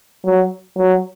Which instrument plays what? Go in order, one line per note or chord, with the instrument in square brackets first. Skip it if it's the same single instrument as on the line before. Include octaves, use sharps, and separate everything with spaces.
[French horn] F#3
F#3